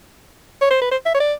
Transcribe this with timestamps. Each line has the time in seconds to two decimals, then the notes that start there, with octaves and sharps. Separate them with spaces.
0.61 C#5
0.71 C5
0.82 B4
0.91 C5
1.06 E5
1.15 C#5
1.20 D5